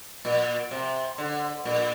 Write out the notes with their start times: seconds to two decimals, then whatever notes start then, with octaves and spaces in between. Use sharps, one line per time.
0.25 A#2
0.71 C3
1.18 D3
1.65 A#2